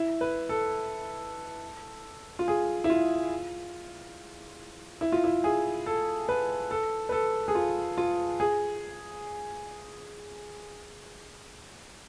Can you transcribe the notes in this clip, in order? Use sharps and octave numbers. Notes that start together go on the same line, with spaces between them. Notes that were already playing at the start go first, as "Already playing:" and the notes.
Already playing: E4
B4
A4
F4
G#4
E4
F4
E4
F4
E4
G#4
A4
B4
A4
B4
A4
G#4
F4
F4
G#4